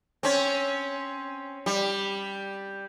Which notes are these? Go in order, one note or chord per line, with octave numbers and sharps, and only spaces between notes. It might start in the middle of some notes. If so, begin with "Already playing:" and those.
C4 C#4
G3